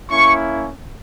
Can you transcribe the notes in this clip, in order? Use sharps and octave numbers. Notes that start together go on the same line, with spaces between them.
A#3 C#4 E4 C#6